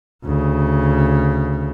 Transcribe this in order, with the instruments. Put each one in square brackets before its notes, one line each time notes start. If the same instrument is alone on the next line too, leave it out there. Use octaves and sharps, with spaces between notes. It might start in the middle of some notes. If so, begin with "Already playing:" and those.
[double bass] D2 C#3